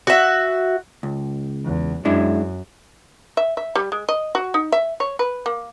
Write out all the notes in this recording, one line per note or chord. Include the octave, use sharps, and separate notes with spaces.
F#4 E5
C#2
E2
F#2 G#3 D4 E4
E5
E5
G3
G#3
D#5
F#4
D#4
E5
C#5
B4
A#3